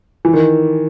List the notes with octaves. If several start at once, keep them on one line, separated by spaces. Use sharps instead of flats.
E3
D#3